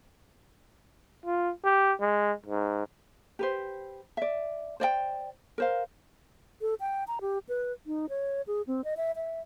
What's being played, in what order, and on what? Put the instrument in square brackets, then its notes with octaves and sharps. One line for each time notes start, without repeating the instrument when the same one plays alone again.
[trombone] F4
G4
G#3
G#2
[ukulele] G4 B4 C5
D5 E5
C5 D5 D#5 G5
A#4 C5 F5
[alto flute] A4
G5
A#5
G4
B4
D#4
C#5
G#4
C4
D#5
E5
E5